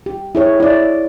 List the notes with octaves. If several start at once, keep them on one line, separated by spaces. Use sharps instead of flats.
G4
E4 G#4 C#5
E4 D5